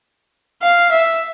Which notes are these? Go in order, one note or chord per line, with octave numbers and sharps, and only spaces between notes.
F5
E5